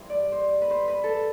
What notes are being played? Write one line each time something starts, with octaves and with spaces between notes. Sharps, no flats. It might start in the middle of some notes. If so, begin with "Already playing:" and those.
Already playing: G2 E3 C5
D5
C5
B4
C5
B4
A4